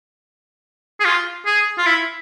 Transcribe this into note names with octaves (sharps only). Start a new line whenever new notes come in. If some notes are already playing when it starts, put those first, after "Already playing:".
G#4
F4
G#4
F4
E4